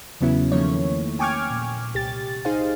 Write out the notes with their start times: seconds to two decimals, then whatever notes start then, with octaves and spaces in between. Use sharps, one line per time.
0.21 E2 C#3 F#3 B3 C#4 E4
0.52 D#3 F3 A3 A#3 C#4 C#5
1.19 G5 G#5 C#6 D6 F6 G#6
1.50 A#2
1.94 C2 G4 A6
2.45 D#4 G#4 C5 F5